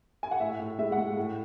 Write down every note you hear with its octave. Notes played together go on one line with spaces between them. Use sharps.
G#5
F#5
A2 E5
A2
G#3 E5
F#5
G#3
A2